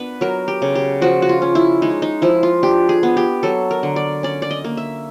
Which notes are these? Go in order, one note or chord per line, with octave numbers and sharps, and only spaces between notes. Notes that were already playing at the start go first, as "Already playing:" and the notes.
Already playing: B3 D4 B4
F#3 A#4
G4
C#3
G4
F3 F#4
F#4
F4
C#4
E4
G#3 D#4
D#4
F3 E4
F4
D4 G4
G#4
B3
G4
F#3 A4
A#4
D3
D5
C#4 D5
D5
D#5
A#3
E5